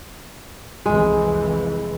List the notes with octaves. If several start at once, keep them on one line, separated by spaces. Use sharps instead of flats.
C2 F2 E3 G#3